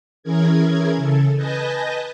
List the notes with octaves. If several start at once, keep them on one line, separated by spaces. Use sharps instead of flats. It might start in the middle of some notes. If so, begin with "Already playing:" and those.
E3 C#4 E4 G#4 A#4 G#6
C#3 A4
B4 D#5 G#5 A5 G6 A#6